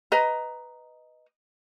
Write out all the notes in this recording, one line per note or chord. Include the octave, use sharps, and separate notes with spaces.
B4 D#5 A#5